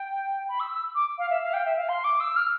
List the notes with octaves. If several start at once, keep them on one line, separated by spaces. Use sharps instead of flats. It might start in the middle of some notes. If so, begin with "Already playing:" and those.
Already playing: G5
B5
E6
E6
D6
F5
E5
F5
G5
E5
F5
C6
D6
E6
F6